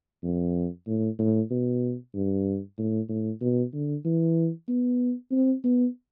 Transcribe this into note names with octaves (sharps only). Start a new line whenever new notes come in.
F2
A2
A2
B2
G2
A2
A2
B2
D3
E3
B3
C4
B3